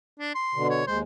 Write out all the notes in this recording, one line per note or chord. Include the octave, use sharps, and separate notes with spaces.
D4
C6
B2 D3
C#5
D#2 G#3 C5